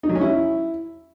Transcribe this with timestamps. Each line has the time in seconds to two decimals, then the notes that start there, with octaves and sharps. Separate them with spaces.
0.03 D#4
0.09 F#3
0.15 C#4
0.21 E4